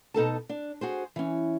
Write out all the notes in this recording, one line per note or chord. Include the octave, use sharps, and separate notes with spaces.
B2 D#4 A4 A5
D4
F#4 G#4 C5
E3 C#4